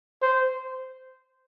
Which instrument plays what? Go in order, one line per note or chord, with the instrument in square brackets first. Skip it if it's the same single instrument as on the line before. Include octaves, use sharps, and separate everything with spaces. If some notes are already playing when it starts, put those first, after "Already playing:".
[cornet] C5